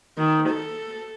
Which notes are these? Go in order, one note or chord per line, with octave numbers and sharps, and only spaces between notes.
D#3
A4